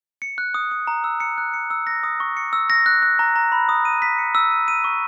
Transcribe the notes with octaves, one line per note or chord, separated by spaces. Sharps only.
C#7
F#6
D#6
D#6
A#5
E6
C#7
F#6
C#7
E6
A#6
D#6
C#6
C#7
E6
A#6
F#6
F#6
A#5
A#5
B5
D#6
D#7
B6
C#7
E6
D#7
D#7
C#6